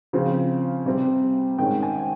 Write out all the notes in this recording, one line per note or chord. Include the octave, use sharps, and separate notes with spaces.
C#3 F3 C4
C3 G3 C4
G#2 D#3 G#3 C#4 G5
G#5